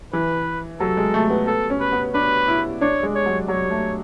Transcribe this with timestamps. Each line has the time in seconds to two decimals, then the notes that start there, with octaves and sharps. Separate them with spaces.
0.13 E3 B4
0.80 F#3 A4
0.97 G#3
1.14 A3
1.30 B3
1.47 B3 A4
1.70 C#4
1.80 B4
1.92 B3
2.14 D4 B4
2.48 E4
2.81 D4 C#5
3.03 G#3
3.15 C#5
3.26 F#3
3.48 F#3 C#5
3.70 A3